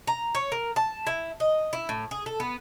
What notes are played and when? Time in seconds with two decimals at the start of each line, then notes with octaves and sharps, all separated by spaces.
0.07 A#5
0.35 C#5
0.52 A#4
0.76 A5
1.07 E4
1.40 D#5
1.73 E4
1.89 A2
2.11 G#4
2.26 A4
2.40 B3